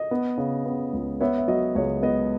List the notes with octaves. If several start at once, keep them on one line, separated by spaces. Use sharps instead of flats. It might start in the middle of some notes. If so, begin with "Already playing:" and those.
Already playing: D#5
B3
C#3
B3
C#2
B3 C#5 E5
E5
F#3 D#5
C#2 C#5
B3 D#5